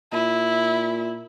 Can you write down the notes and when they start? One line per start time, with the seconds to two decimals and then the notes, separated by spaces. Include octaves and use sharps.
0.13 A#2 E4